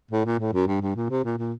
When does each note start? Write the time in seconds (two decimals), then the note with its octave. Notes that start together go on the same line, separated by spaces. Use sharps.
0.11 A2
0.26 A#2
0.40 A2
0.53 F#2
0.67 G2
0.81 G2
0.95 A#2
1.10 C3
1.24 A#2
1.38 A#2